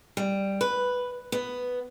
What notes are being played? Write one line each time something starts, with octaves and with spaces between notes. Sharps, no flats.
G3
B4
B3